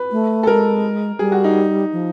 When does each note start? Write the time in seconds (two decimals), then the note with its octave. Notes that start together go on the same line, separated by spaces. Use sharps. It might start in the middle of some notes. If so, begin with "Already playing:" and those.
Already playing: B4
0.12 A3
0.43 A4
0.47 G#3 A#4
1.19 G3 G#4
1.32 F#4
1.44 D#4
1.92 F3